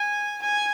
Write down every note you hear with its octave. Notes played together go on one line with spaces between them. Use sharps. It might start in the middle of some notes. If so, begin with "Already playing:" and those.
Already playing: G#5
G#5